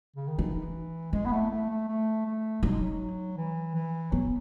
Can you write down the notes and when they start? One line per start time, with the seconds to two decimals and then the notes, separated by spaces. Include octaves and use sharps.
0.16 C#3
0.28 D#3
0.39 E3 D#4
1.13 G#3 E4
1.26 B3
1.32 A3
1.51 A3
1.70 A3
1.88 A3
2.26 A3
2.63 F#3 D#4
2.71 G#3
2.80 F#3
3.37 E3
3.74 E3
4.11 F#3 B3